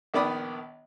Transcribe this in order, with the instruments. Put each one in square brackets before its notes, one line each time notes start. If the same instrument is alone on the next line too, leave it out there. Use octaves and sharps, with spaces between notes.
[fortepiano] A#1 D#3 B3 D5 B5 D#6